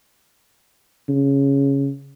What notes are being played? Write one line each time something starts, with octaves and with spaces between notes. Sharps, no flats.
C#3